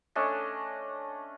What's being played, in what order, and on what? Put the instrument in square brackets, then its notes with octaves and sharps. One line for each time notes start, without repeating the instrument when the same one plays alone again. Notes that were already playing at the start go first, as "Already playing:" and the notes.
[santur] A3 C#4 D4 D#5